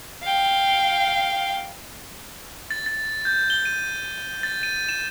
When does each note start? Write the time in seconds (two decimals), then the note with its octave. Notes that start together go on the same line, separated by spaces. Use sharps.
0.23 F5 G5
2.71 A6
2.86 A6
3.25 G6
3.50 G7
3.65 D#7
4.43 A6
4.63 D#7
4.89 E7